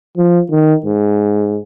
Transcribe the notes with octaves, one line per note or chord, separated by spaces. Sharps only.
F3
D#3
G#2